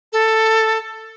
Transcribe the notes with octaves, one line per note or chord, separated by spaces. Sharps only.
A4